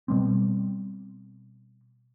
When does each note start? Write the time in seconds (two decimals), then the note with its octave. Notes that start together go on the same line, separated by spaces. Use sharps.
0.08 B2 G3 C4